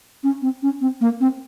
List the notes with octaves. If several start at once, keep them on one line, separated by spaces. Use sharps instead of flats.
C#4
C4
C#4
C4
A#3
C4